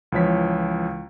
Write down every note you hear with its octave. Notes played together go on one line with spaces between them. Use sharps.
C#2 E3 F3 C#5 B6